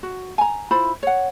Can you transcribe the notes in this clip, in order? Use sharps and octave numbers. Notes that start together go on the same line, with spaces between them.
F#4
G#5 A#5
E4 F4 C5 B5
C#5 F#5